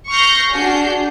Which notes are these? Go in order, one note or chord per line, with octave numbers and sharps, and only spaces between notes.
C#6 F6 G6 A#6 C7
D4 F#4 G#4 G6 C7